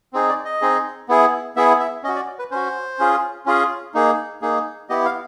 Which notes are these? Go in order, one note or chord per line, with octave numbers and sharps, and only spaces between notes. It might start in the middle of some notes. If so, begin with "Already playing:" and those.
C4 D#4 G#4
D5
D#5
C4 D#4 G#4
B3 E4 G#4
B3 E4 G#4 E5
E5
C#4 F#4 D#5
D5
B4
C#4 F#4 C5
C#4 F4 G#4
C#4 F4 G#4
A#3 D#4 G#4
A#3 D#4 G#4
B3 E4 G4 D#5
F5